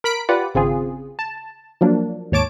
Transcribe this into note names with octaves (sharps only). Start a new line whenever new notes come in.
A#4 B5 B6 D7
F4 G4 B4 D5 F#5
G#1 C#3 C4 F4 G#4
A5
F3 F#3 A#3 D4
D#2 G#2 C#5 A5 D6 D7